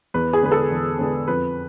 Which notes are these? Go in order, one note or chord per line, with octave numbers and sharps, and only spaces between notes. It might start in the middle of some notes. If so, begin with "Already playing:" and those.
E2 B4
G#4
D3 G#3 B3 B4
A4
E2
D3 G#3 B3
F2 B4